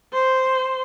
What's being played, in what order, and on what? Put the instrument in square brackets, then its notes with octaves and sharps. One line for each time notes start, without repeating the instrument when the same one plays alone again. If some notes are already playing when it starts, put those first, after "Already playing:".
[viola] C5